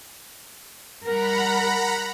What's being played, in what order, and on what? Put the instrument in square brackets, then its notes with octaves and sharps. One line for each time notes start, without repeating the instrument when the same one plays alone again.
[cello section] G3 A#4 [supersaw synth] F#5 A#5 B5